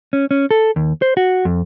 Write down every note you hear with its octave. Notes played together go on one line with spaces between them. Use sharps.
C#4
C#4
A4
D#2
C5
F#4
F2